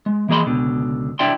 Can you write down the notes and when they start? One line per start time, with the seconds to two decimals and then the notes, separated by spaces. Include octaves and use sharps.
0.06 G#3
0.29 E3 A#3 G#4 D#5 B5 C6
0.46 C#2 B2 D3
1.19 D4 E4 D5 E5 G5 C6